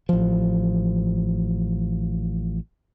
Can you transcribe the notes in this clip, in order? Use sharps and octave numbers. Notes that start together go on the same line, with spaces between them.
A1 F3